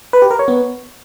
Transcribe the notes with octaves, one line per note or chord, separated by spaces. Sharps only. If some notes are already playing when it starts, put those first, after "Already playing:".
B4
G4
A#4
C#5
B3